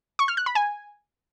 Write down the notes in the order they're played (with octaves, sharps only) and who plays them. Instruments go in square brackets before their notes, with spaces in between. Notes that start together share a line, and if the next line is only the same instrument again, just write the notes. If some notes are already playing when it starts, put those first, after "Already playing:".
[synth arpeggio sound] C#6
F6
F#6
B5
G#5